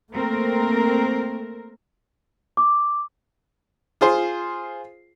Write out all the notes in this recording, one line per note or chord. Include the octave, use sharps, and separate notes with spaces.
A3 A#3 C4 A#4
D6
F4 G#4 C5